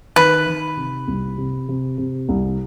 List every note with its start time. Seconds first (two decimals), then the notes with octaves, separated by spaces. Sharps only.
0.16 D#3 B4
0.47 D#3
0.77 C3
1.08 C2
1.38 C3
1.69 C3
1.98 C3
2.29 C2